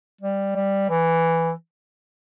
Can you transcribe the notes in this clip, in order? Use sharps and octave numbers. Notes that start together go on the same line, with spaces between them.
G3
G3
E3